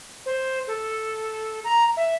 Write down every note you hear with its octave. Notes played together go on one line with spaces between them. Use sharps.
C5
A4
A#5
E5